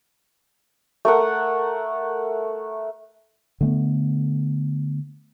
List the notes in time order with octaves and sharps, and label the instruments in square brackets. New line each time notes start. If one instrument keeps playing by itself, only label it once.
[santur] A3 A#4 F#5
[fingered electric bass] D3 A3 B3